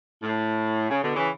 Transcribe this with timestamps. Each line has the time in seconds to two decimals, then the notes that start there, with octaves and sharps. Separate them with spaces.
0.23 A2
0.90 C#3
1.03 B2 D3
1.16 C#3 E3